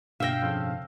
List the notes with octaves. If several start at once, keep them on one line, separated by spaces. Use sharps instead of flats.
G2 B2 D4 E5 F5 G5 E6 A#6
F2 C#3